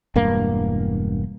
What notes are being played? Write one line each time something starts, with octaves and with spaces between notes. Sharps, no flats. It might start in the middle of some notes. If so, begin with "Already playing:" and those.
E1 G2 A#3